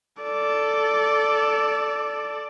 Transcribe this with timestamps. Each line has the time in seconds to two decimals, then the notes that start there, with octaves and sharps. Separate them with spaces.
0.23 A4 D5